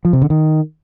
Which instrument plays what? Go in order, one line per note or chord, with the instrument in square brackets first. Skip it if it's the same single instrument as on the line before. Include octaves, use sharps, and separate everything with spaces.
[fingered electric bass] F3
C3
D3
D#3